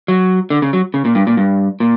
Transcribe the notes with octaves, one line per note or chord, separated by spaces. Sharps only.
F#3
D3
C#3
F#3
C#3
A#2
G2
A#2
G2
A#2